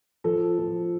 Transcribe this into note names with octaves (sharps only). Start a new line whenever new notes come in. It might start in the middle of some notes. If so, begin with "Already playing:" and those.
F3 A4
F3